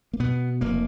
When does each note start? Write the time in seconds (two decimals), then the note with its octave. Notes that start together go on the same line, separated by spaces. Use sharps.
0.13 A#3
0.20 B2 B3
0.61 F1 A#3